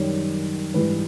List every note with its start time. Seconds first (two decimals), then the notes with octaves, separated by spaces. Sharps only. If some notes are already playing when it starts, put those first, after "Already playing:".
Already playing: F#2 D#3 G3 C#5
0.74 G#2 E3 G3 B4